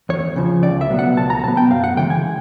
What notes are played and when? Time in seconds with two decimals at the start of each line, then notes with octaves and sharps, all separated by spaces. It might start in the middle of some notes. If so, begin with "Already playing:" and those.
0.09 E2 C#5
0.36 C#3 F3
0.63 C#2 D5
0.81 E5
0.90 B2 F#3 B3
0.99 F#5
1.17 C#2 A5
1.30 A#5
1.43 B2 F#3 B3 A5
1.57 G5
1.71 F#2 F5
1.84 F#5
1.97 C#3 E3 G#3 G5
2.10 G#5